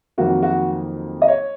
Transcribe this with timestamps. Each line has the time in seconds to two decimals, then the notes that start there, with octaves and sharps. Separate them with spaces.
0.18 F2 D#3 F#3 A#3 F#4
0.43 F#4
1.22 D#5
1.28 C#5